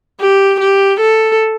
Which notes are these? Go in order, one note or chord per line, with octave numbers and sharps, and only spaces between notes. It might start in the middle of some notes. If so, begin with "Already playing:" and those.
G4
G4
A4